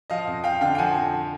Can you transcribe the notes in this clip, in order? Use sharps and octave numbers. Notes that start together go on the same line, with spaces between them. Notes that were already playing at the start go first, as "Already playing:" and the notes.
F3 D#5 F5
F2
F2 F5 G5
D3 F5 G5
G5
F3 F#5 G#5
F2